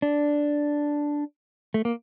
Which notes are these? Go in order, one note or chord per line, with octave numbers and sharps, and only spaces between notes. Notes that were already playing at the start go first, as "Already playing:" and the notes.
D4
A3
A#3